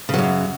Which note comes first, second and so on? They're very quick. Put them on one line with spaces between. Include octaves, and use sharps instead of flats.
C#3 F#3 F#2